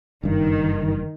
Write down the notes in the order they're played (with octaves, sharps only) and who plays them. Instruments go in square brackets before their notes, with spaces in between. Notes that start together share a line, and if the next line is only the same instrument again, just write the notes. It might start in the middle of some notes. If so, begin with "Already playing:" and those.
[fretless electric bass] F#1 G2 [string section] D#3